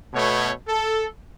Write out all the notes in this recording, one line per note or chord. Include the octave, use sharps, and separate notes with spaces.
B2 A3 C#5
A4